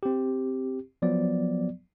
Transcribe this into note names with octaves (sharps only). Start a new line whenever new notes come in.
C4 G4
F3 F#3 B3 D5